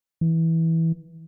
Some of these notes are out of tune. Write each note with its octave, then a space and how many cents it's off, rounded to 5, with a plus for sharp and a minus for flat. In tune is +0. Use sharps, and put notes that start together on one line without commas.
E3 -15